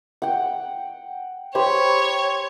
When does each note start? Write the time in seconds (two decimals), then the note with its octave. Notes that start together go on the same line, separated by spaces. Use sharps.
0.22 F#5 G5
1.55 G4 C5 C#5 B5